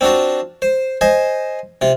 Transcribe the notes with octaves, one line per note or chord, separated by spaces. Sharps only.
C4 D4 F4 F#4
C5
C5 D#5 G#5
C3 F4